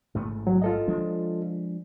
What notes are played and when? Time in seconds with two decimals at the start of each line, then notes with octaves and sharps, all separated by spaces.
0.15 A1 G#2 A3
0.47 C2 F#3
0.62 F4 A4 D#5
0.87 F3 G#3 D4